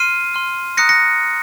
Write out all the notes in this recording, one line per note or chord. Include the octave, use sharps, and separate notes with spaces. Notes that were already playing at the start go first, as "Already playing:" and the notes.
Already playing: C6 F6 C7 D#7
C6 F6
A#5 D#6 F#6 A#6 C#7
A#6 C#7